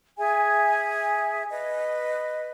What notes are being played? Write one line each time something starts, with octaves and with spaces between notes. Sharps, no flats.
G#4 E5 G#5
B4 D#5